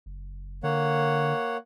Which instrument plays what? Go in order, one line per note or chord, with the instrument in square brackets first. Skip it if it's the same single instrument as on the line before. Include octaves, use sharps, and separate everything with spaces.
[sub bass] F#1
[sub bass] D3 [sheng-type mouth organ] A#3 C#5 F#5